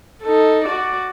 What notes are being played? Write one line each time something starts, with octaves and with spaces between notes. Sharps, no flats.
D#4 A4
F#4 D5